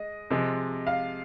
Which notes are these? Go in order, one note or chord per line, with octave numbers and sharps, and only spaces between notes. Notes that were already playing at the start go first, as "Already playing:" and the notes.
Already playing: G#3 D#5
C3 F3 G#3
F5